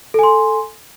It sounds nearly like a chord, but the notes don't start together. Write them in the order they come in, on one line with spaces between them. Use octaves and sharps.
A4 G#5 C6